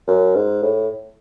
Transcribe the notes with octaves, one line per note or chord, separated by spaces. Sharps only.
F#2
G#2
A2